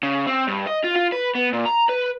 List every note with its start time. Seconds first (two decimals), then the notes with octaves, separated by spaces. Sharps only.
0.03 C#3
0.27 C4
0.47 G2
0.67 D#5
0.84 F4
0.96 F4
1.12 B4
1.35 B3
1.53 A#2
1.65 A#5
1.89 B4